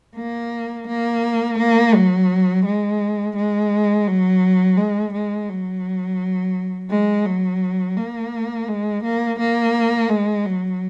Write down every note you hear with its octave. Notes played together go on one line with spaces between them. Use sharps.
A#3
A#3
A#3
F#3
G#3
G#3
F#3
G#3
G#3
F#3
G#3
F#3
A#3
G#3
A#3
A#3
G#3
F#3